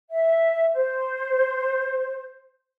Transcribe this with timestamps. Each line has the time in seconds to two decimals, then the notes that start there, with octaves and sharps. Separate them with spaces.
0.10 E5
0.74 C5